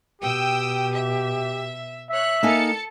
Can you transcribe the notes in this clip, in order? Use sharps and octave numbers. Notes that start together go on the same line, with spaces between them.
B2 G4 G5 D#6 E6
E5
C#5 E5 F#6
A#3 D#4 A4 G#5 A5 C#7